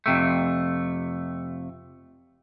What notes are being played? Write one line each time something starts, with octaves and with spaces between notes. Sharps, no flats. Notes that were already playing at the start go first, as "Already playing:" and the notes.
F2 C3 A3